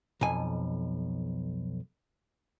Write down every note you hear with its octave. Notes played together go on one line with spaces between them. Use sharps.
B1 F2 G#5